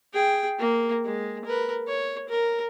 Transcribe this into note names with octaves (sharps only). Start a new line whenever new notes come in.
G#4 G5
A#3
G#3
A#4 B4
C#5
A#4